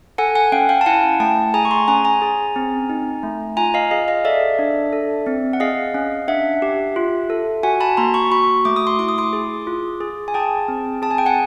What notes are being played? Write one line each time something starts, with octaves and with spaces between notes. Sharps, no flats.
A4 F#5 G#5
F#5 G#5
C#4 F5 G5
F5 G5
A5
E4 F#5 G#5
A3 G5 A5
G#4 G#5 A#5
C#6
A#5 C6
C#4 G#5 A#5
G#5 A#5
G#4
C4
D#4
A3
F4 G#5 A#5
D#5 F5
G#4 D#5 F5
D#5 F5
A4 D5 E5
D4
A4
C4
F#5
G#4 D#5 F5
C#4
D4 E5 F#5
G4
F4
A4
F#4 F#5 G#5
A5 B5
A#3 A#5 C6
B5 C#6
F#4 B5 C#6
A3 D6
D#6
C6 D6
E4 D6
D#6
C6 D6
G#4
F4
G#4
G#5
G#4 G5 A5
C4
G#4 A5
G#5
G5
F#5 G#5